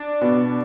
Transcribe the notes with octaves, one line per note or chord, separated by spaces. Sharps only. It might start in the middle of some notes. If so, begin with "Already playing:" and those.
Already playing: D4
B2